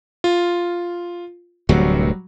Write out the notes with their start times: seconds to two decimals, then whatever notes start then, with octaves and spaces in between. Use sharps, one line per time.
0.24 F4
1.69 D1 D2 C3 F#3 G3 F#4